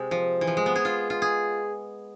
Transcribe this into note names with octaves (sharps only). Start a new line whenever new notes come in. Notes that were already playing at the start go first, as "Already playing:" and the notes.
Already playing: C3 G#3
F3
E3
F3
G#3
B3
G#4
F4
F4
G#4